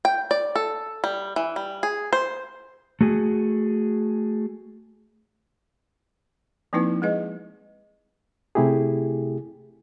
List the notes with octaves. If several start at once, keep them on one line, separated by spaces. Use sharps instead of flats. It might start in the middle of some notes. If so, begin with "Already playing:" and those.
G5
D5
A4
G3
E3
G3
G#4
C5
A3 F#4 G#4
F3 A#3 C4 D#4 E4 B4
G#3 G#4 B4 D#5
C3 A3 E4 G4 G#4